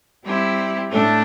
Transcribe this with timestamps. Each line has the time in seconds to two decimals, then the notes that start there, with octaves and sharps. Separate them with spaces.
0.25 G3 C4 E4 G4
0.91 A2 A3 D4 A4